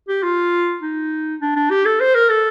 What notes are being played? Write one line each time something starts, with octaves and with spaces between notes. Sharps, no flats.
G4
F4
D#4
D4
D4
G4
A4
C5
A#4
A4